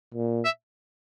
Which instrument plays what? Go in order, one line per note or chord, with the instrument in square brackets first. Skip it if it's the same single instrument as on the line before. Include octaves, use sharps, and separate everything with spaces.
[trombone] A#2
[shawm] E5